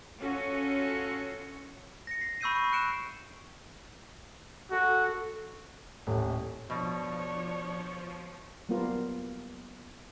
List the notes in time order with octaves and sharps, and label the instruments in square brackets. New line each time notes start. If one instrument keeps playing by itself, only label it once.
[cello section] C#4 F4 F#4 A4
[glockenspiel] A#6 C#7
C7
B5 C#6 E6 G6 C7 D#7
C#6
F#6 C#7 D7 E7
[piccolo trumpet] F#4 [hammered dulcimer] A4 G5 A5
[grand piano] D#1 [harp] A2
[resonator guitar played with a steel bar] B2 [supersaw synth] F3 [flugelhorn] D4 [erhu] C#5
[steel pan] F#3 G3 A#3 B3 F4 A#4